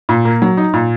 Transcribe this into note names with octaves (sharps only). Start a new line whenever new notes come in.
A#2
A#3
F#3
D#4
A#2